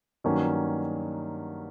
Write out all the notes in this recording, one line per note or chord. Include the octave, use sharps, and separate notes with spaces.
G2 D#3 F#3 A#3 C#4